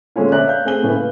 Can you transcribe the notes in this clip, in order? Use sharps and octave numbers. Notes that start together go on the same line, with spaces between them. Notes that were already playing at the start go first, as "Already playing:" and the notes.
A#2 D3 G#3 A3 C#4 F4
C#5 D5 E5 A#5 F#6
F5 G6
A3 C4 G#4 G7
A2 C#3 A#3 B3 E4
F5